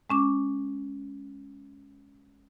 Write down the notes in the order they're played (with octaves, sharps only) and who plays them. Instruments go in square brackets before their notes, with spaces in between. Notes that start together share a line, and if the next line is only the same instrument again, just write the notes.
[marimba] G#3 C#4 D6